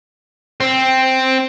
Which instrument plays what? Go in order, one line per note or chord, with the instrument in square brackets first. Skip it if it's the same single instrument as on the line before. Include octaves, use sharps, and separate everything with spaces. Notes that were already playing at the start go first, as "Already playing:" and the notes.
[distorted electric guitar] C4